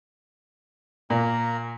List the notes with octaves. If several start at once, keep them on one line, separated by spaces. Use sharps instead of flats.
A#2 A#3 A#5